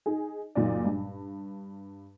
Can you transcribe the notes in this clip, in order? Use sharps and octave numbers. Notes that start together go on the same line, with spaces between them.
D#4 G#4
F#1 A#2 D#4 D5
G2